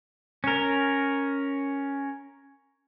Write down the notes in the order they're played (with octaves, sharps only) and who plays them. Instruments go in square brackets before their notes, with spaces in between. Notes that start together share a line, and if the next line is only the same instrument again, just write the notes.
[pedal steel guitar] C#4 A#4